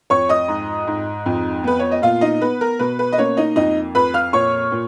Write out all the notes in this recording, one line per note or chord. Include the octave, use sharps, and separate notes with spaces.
F2 C#5 C#6
D#5 D#6
G#2
G#2
F2
B3 B4
C#5
D#5
A#2 F4 F5
D#4 D#5
B3 B4
A#4
B2 B4
B4
D#5
A#3 C#4 C#5
D#4 D#5
F2 D#4 D#5
F2 B4 B5
F5 F6
A#2 C#5 C#6
A#2